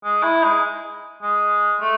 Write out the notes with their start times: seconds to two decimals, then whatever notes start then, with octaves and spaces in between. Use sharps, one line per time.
0.04 G#3
0.23 E4
0.44 G#3
1.23 G#3
1.81 A3